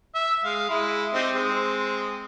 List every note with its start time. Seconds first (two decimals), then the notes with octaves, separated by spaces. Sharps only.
0.15 E5
0.44 G#3 F5
0.69 G#3 E4
1.14 C4 D#4 G4
1.35 G#3 C4